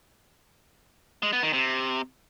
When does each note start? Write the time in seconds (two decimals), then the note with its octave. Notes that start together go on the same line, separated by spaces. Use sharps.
1.22 G#3
1.33 B3
1.43 D#3
1.53 C3